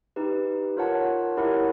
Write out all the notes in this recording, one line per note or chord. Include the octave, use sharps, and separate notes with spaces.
D#4 G4 B4
F4 A#4 C#5 F#5 A5
E4 G4 A#4 C#5 F#5